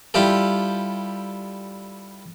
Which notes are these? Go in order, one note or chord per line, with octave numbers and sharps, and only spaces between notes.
G3 E4 F4 G4 A4